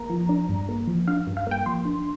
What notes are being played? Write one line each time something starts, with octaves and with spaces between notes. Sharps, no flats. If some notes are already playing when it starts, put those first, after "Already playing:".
Already playing: A#3 A#5
F3
D4
G2
A#3
F3
D4 F5
G2
F5
A#3 G5
F3 C6
D4